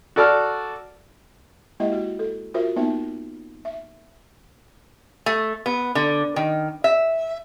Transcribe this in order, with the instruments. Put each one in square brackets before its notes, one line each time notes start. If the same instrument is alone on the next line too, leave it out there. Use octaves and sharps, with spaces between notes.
[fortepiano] F#4 A4 D5 A5 F6
[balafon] G#3 A#3 E4 G4 D#5 E5
F#4
A4
F4 F#4 A#4 C5 E5
A#3 B3 D#4 C5 E5
E5
[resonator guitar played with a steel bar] A3
B3
D3
D#3
E5